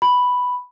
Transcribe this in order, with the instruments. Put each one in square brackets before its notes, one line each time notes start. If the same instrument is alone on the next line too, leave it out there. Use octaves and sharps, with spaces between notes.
[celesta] B5